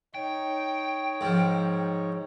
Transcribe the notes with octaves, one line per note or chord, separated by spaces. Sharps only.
D#4 C#5 G5
G#2 F3